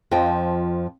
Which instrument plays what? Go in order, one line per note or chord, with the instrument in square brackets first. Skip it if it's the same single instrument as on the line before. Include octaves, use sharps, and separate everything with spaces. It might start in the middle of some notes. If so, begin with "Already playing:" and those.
[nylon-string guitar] F2 F3 D#5 G5